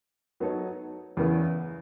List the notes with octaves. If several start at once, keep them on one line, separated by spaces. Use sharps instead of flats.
F#3 B3 D#4 A4 C#5
E2 C#3 E3 B3 E4